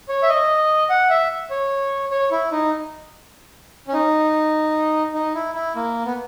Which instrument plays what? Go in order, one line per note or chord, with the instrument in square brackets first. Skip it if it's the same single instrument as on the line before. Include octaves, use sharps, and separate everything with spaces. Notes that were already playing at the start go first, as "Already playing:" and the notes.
[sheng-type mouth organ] C#5
E5
D#5
F#5
E5
C#5
C#5
E4
D#4
C#4
D#4
D#4
E4
E4
A#3
B3